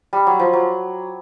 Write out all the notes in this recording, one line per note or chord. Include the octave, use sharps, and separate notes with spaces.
G3
F#3
F3
F#3